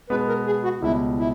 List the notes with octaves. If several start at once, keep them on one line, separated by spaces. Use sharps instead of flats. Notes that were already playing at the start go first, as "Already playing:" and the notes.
B2 G#3 B3 B4
A#4
G#4
F#4
C#2 B2 G3 E4
E4